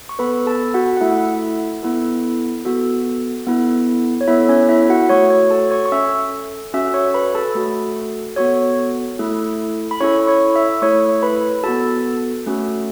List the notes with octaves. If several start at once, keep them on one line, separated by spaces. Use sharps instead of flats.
C#6
B3 A4 B4 B5
A4 A5
F#4 F#5
F#5
A3 E4 A4 E5
B3 E4 A4
B3 F#4 A4
B3 E4 A4
C#5
B3 E4 A4 E5
C#4 C#5
E4 E5
F#4 F#5
A3 F#4 A4 C#5 C#6
C#5 C#6
A4 A5
C#5 C#6
C#6
C#4 A4 E5 E6
C#4 F#4 A4 E5 E6
C#5 C#6
B4 B5
A4 A5
A3 F#4 A4
B3 F#4 A4 C#5 C#6
A3 E4 A4
B5
C#4 E4 A4 C#5 C#6
C#5 C#6
E5 E6
A3 E4 A4 C#5 C#6
B4 B5
B3 F#4 A4 A5
A3 C#4 F#4 A4